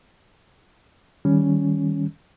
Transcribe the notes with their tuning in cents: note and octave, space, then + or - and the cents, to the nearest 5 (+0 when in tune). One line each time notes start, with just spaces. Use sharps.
D#3 +0 G3 +0 C#4 +5